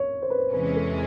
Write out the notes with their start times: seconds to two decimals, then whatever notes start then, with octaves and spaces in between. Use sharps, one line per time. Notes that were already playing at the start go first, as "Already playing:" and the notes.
Already playing: C#5
0.22 C5
0.30 B4
0.38 C5
0.52 E2 C3 E3 G#3 C#4 B4
0.76 A4